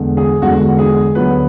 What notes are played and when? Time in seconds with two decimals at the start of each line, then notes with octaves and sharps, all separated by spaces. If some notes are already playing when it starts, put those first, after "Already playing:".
Already playing: E2 D3 G#3
0.17 G#4
0.42 E2 D3 G#3 F#4
0.79 G#4
1.15 D2 D3 F#3 B3 B4